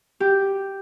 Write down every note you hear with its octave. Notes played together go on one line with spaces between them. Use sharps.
G4